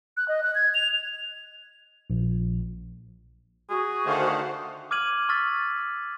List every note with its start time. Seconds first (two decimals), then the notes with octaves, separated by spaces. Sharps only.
0.17 F#6
0.28 D#5
0.43 F#6
0.55 G#6
0.74 F7
2.10 A#1
3.70 F#4 G#4
4.05 D3 D#3 A3 C5 F5 F#5
4.91 D6 F6 G#6 D#7 F#7
5.29 C#6 E6 F6 A6 B6